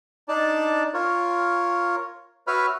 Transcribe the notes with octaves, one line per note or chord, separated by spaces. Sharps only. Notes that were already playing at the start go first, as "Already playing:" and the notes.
D4 D#4 D5 A5
F4 A#4 C#5
F#4 B4 C#5 E5 B5 F6